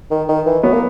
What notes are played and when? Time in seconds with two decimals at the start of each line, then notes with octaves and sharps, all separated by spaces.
0.11 D#3
0.29 D#3
0.46 E3
0.63 F#3 B3
0.73 A#3